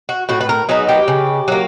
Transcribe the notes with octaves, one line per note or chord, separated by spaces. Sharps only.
F#4
A2 F#4
B4
A#4
F#3 B3 D#4 G#4
G4
C#3
F#3 A#3